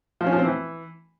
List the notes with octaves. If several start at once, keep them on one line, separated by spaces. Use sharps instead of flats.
F3
C#4
F3
C4
E3